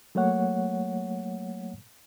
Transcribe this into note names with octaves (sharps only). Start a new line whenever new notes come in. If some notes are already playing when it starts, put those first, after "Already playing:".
F#3 A3 A#3 C#5 F#5